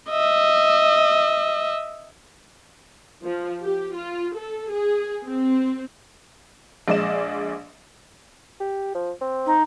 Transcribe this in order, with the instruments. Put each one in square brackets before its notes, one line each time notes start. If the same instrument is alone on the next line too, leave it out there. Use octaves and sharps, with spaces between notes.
[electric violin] D#5 E5
[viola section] F3
G4
F4
A4
G#4
C4
[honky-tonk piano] A#1 G#3 D5 D#5 E7
[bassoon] G4
F3
C4
[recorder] D#4